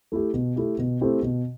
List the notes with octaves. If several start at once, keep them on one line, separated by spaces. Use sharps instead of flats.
A3 E4 G4
B2
A3 E4 G4
B2
A3 C4 E4 G4
B2